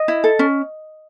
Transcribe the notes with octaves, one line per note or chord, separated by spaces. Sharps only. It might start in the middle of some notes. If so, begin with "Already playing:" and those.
Already playing: D#5
E4
A4
C#4